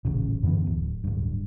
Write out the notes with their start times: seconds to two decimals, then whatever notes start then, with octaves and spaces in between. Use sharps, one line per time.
0.05 D#1 A1 C#3
0.43 F#2 D3 E3 B3
0.66 D1
1.04 D1 G2